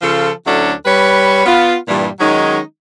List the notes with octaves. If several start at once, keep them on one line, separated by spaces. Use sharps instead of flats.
C#3 F3 F4 A4
D2 F#3 C#4 D4 E4 A4
G3 B4 C#5
B3 F4
G2 A#2 E3 G3
D#3 F#3 G#3 C#4 D#4